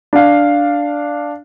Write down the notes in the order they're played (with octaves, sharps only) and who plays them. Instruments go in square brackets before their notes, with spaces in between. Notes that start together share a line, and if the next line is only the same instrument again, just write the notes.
[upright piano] D4 F5